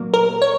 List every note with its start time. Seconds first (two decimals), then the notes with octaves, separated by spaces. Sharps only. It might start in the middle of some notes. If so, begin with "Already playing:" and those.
Already playing: A#2 F#3 A#3
0.14 A#4
0.42 C#5